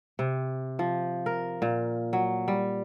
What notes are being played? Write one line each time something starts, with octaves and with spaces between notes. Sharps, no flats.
C3
F3
A#4
A#2
F#3
G3